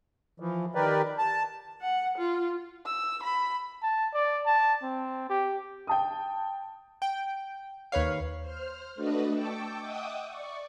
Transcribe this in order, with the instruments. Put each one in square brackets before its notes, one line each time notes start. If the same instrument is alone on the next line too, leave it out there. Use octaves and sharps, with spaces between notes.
[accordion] E3 F3
D#3 G4 A#4 B4 D5
A5
[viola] F#5
F4
[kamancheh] E6
B5
[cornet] A5
D5
A5
C4
G4
[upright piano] G5 A5 D#6
[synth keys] G5
D#2 B4 C#5 F5
[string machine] C5 F6
A3 D4 F#4 B4 D#5
G5 A5 C#6 D6 E6
D#5 E5 F#5 G5 D6 D#6
D5 C#6